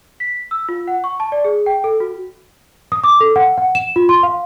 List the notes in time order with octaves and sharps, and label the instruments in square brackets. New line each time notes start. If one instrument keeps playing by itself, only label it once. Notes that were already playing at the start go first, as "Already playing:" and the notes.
[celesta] B6
E6
F4
F#5
C#6
A5
D5
G#4
G5
A4
F#4
D#6
D6
A4
F#5
F#5
E7
F4
C6
F5